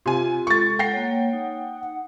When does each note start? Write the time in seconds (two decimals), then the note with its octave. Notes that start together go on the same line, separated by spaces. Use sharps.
0.06 C3 F4 G#5
0.47 G#3 A4 C#6 A6
0.79 F#5 G5 A#6 C7
0.93 A#3 C#5
1.33 D#4